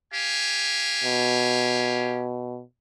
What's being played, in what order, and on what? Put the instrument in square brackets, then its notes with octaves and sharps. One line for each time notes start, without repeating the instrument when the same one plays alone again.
[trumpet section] G4 F5 G#5
[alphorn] B2